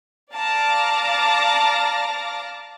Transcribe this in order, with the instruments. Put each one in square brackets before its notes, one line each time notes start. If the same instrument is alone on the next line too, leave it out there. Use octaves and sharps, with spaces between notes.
[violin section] D5 F5 A5 A#5 D6 A#6